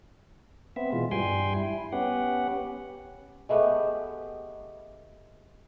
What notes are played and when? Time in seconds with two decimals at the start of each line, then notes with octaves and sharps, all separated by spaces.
0.76 B3 C4 E5
0.92 B2 E3 G#3 F4
1.11 G2 G3 G5 G#5 C6
1.55 E4
1.92 B3 C#4 G4 F#5
3.49 G#3 A3 B3 G4